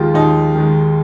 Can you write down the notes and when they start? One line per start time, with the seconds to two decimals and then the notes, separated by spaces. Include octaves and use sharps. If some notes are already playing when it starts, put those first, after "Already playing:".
Already playing: D#2 D#3 G#3 F4 G4
0.14 D#2 D#4
0.55 D#3 G#3